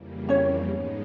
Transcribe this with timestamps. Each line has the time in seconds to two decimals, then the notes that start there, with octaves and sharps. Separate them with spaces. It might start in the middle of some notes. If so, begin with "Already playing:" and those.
Already playing: F2 C#3 E3 G3 A#3
0.29 C#4 C#5
0.66 G#2 F3 G#3 B3 D#4